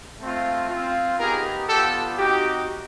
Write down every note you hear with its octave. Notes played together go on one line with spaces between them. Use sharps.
A3 C4 F4
C4 F4
B3 D#4 G4 G#4 A#4
B3 D4 F4 G4 A4
C4 D#4 F#4 G4